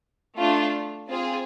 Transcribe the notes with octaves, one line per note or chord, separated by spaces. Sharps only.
A3 D4 F4
C4 F4 G#4